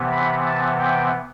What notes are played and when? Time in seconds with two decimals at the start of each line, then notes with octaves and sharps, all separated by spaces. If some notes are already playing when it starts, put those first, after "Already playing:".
Already playing: C3 E3 B3
0.11 B5
0.45 A5
0.78 G5